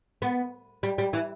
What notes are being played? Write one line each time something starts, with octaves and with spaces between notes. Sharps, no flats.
B3
G3
G3
E3